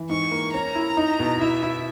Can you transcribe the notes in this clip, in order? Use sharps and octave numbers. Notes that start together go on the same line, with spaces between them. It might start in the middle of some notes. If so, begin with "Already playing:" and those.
Already playing: E3
G#2 C#6
A#3
C#4 A#5
E4
D#4
B2
E4 E5
E4